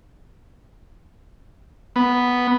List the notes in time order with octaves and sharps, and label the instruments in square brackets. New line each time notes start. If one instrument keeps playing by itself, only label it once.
[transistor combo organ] B3